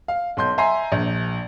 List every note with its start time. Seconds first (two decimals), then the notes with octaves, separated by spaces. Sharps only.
0.08 F5
0.37 B1 C6 G6
0.58 E5 G#5 A#5 C6 C7
0.92 A#1